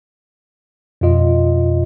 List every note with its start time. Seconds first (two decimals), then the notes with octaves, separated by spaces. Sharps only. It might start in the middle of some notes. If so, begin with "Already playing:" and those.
1.01 F2 B2 F4 D#5